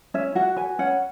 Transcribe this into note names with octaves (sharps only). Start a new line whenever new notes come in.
C#4 E5
F#4 F#5
B4 G#5
C#4 F#5